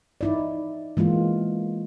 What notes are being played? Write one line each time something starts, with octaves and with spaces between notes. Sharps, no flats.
D#4 E4 D5
E3 G#3 A#3 F4